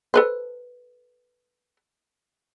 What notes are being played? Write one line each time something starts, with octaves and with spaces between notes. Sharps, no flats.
A4 B4 C5